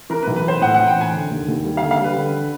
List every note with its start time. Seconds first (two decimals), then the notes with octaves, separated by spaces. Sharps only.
0.10 E3 A#4
0.23 B1 B4
0.36 B4
0.44 E3 C5
0.61 A2 F#5
0.74 E3 F#5
0.88 G5
0.96 A2 G#5
1.13 D3
1.31 D#2
1.48 D#2
1.64 G3
1.77 D3 F5
1.91 F5
1.99 G3
2.04 B4
2.17 D3